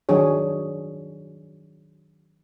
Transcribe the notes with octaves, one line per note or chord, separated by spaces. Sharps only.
D#3 F#3 D4 G#4 C#5